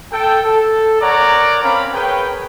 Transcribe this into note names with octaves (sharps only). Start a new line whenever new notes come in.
A4 G5
A4
A#4 C#5 D5 F#5 A#5
C4 C#4 A#4 C#5 F5 B5
G#4 A#4 B4 C#5 G5